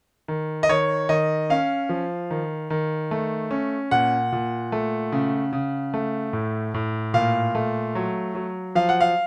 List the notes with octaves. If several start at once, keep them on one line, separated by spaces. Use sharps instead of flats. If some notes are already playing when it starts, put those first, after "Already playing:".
D#3
D#5
D#3 C#5
D#3 D#5
C#4 F5
F3
D#3
D#3
A3
C#4
A#2 F#5
A#2
A3
C#3
C#3
A3
A2
A2
A#2 F5
A3
F#3
F#3
F3 F5
F#5
F5